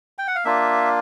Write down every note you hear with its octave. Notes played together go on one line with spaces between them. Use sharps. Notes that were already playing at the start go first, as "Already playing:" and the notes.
G5
F#5
F5
A#3 D4 F4 E5